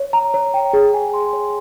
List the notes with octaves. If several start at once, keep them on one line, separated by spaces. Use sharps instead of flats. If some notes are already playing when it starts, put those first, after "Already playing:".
Already playing: C#5
A#5
C#5
G5
G#4
G#5
C6
C#5